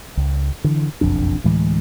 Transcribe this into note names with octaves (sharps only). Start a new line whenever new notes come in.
C#2
D3 E3
F#1 B1 F2 D4
D2 A2 E3 G#3